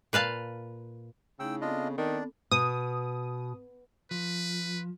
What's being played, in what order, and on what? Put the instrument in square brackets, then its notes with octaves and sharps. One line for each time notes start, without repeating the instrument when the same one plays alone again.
[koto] A#2 B4 F5 A5
[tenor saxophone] C#3 [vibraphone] A3 D#4 E4 [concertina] G5 E6
[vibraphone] B3 C4 A4 [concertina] D4 F4 D#5
[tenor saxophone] D#3 [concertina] D4 D5
[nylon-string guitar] B2 [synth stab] D#6
[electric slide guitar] F3 [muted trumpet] B4